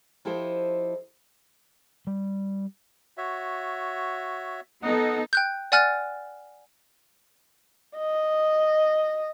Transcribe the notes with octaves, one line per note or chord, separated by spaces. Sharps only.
F3 E4 G4 A4 C5 D#5
G3
F#4 C#5 E5
B3 D#4 A4 D#5 F#5
G5 F#6 G6
D5 F#5 G#5 F6 F#6 A6
D#5